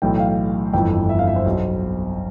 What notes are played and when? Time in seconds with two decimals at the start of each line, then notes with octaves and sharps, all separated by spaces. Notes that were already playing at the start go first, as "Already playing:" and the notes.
0.02 B1 A2 E3 G5
0.15 G5
0.20 F5
0.73 G1 F2 E3 G5
1.09 E5
1.19 F5
1.27 E5
1.36 C5
1.46 B1 B2